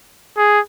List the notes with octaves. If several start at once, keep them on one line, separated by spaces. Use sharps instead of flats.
G#4